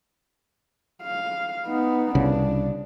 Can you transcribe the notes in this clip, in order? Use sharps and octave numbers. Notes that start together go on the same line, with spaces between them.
F5
B3 D#4
C2 C#3 D4